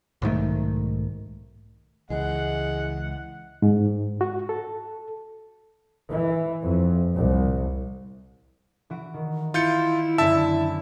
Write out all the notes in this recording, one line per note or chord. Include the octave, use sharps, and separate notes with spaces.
B1 G#2 D#3 A3
C#2 E3 G#3 F#5
G#2
F#4
A4
E3
F2
C2
E3 F#4 D7
D#3
E4 F4 G6 C#7
F#2 D3 B3 E5 A5 E6